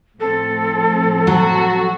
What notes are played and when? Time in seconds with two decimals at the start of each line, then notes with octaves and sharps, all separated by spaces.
0.20 A2 F3 C4 A4
1.27 F#3 F#4